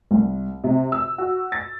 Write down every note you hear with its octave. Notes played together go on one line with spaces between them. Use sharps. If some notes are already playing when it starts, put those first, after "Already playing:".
C2
C3
E6
F#4
A6